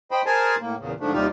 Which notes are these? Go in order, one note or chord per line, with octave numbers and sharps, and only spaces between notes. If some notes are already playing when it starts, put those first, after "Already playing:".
C5 D#5 G5 B5
G#4 A#4 C5 G#5 A5
A2 A#3
E2 A#2 C#3
G#2 D3 F3 A3 D4
D#2 C3 G3 D#4 F4 G4